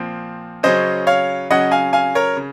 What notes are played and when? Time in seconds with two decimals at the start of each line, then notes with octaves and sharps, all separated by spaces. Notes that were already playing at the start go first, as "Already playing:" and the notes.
Already playing: A#2 F3 C4
0.63 C#3 F#3 C#4 C5 D#5
1.07 C#5 F5
1.50 C#3 F#3 C#4 D#5 F#5
1.71 F5 G#5
1.93 F5 G#5
2.15 A#4 C#5
2.37 C#3